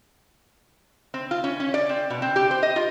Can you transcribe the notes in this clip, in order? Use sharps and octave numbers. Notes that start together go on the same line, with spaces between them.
C4
F4
C#4
C#4
D5
C4
B2
C4
G4
C5
D#5
F4